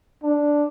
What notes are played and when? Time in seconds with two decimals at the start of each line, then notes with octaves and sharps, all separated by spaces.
0.23 D4